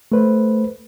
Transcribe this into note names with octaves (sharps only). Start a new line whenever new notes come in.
A3 B4 C5